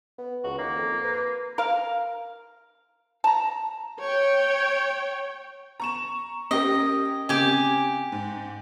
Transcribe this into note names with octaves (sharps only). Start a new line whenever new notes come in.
B3
C#2 F#4
D#3 A#3
F2
B4
A#4 F5
A5 A#5
C#5 G5
A#5 C#6 E7
C#4 G4 A#4 D#5
C#3 C4 G4 G#5
G#2